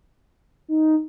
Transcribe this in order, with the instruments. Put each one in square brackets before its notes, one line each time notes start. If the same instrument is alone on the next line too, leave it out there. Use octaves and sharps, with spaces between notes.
[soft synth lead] D#4